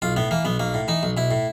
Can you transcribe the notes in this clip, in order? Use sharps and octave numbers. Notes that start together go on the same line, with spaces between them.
B1 F4
A2 B3
E3 A#3
B1 B3
B1 A#3
A2
E3 D#4
B1
B1 E4
A2